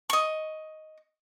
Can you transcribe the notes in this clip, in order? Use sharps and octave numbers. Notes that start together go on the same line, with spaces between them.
D#5 C#6